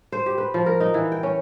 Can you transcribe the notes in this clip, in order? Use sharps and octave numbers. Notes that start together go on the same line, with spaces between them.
C5
G4
B4
F3
A#4
D#4
E3
G5
C#4